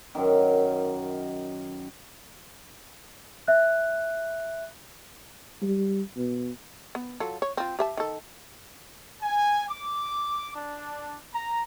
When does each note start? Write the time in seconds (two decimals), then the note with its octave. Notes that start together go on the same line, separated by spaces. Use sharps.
0.15 F#2 D#3
3.48 E5 F#6
5.62 G3
6.17 B2
6.95 B3
7.20 F#3 F4 A4
7.42 C#5
7.57 C4 F4
7.79 G4 E5 A5
7.97 D#3 A4
9.21 G#5
9.69 D6
10.54 D4
11.34 A#5